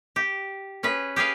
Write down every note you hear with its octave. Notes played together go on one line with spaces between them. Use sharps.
G4
C#4 G#4 B4
G4 G#4 B4 F5